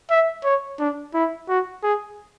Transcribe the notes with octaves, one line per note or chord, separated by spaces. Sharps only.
E5
C#5
D4
E4
F#4
G#4